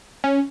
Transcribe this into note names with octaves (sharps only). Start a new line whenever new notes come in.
C#4